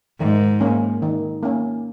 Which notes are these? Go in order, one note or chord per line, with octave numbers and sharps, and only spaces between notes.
G#2 D#3
A#3 C#4
D#3
A#3 C#4